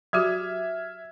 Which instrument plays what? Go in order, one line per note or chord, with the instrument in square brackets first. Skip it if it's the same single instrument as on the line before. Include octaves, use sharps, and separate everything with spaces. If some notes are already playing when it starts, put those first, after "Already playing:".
[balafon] F#3 F#4 G4 [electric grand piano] E5 F6 G#6